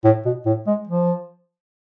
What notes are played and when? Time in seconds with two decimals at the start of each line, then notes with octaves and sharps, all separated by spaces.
0.04 A2
0.25 B2
0.46 A2
0.67 G#3
0.87 F3